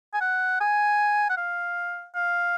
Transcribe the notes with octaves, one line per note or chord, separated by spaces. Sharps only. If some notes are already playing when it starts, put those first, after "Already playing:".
G#5
F#5
G#5
F#5
F5
F5